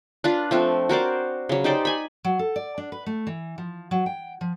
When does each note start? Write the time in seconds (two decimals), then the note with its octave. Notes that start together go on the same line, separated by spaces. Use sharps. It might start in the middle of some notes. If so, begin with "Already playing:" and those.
0.24 D4 F4 B4
0.51 F3 A3 C4
0.89 F#4 A#4 C5 D5
1.49 C#3 F#3
1.64 D#4 G4 C5 D5
1.85 G#5 B5
2.24 F#3
2.39 A4
2.56 D5
2.78 D4
2.92 B4
3.06 A3
3.27 E3
3.58 F3
3.91 F#3
4.06 G5
4.41 F3